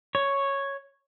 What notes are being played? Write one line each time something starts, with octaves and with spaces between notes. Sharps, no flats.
C#5